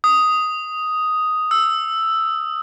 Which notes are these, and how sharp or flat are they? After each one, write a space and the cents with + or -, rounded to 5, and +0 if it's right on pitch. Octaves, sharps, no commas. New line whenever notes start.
D#6 +5
E6 +5